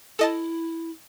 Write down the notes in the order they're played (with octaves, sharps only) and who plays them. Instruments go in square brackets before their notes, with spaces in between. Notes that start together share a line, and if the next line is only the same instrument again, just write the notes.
[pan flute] E4 [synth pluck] A4 D#5 A5